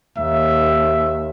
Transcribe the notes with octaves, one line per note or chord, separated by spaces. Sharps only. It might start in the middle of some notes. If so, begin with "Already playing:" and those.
D#2 E5